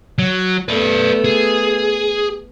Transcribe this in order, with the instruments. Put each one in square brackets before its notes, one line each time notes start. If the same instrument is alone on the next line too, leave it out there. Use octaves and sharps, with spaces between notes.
[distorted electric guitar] F#3
[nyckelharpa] A3 B3 [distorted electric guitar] B4 D5
[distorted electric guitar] G#4